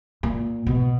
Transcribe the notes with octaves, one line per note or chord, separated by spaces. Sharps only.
A#2
B2